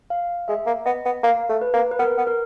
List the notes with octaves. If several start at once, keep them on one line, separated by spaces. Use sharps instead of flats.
F5
G#3 E5
A#3
B3 D#5
B3
A#3 F5
A3
B4
A#3
B4
B3 A#4
B3
A#4